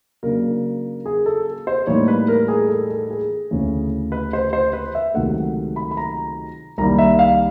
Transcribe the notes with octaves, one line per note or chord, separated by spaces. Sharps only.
C#3 F#3 A#3 D4 A#4
G#4
A4
C5
A2 E3 G3 A#3 D#4 C#5
B4
A#4
G#4
A4
A4
G#4
D2 C#3 E3 A3 C#4
B4
C5
C5
B4
E5
C#2 C3 D#3 F#3 A3 F#5
B5
B5
A#5
C2 C3 D#3 G3 A#3 A#5
E5
F5